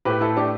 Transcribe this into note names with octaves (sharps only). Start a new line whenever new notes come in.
A2 A3 G4 B4
E4 A4
D4 G4